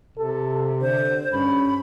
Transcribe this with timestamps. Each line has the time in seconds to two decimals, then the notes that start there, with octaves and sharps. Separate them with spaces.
0.17 C3 A4
0.81 D3 C5
1.32 G2 C#4 B5